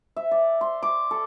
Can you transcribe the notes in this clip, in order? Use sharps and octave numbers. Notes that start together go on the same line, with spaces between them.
E5
D5
C6
D6
A4